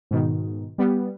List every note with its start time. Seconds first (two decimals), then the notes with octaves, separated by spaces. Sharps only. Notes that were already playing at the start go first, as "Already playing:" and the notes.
0.11 G#2 B2 D#3
0.78 G3 B3